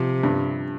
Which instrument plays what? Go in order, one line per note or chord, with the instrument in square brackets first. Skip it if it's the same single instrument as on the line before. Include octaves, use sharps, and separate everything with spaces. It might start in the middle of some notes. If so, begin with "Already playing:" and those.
Already playing: [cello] C3 [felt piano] F3
[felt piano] G2